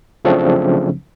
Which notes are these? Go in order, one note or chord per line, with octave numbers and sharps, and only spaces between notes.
C#3 F3 F#3 A3 C4 D4